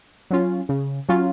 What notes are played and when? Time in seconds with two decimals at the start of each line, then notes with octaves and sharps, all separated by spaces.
0.30 F#3 C#4 F4
0.69 C#3
1.09 F#3 C#4 F4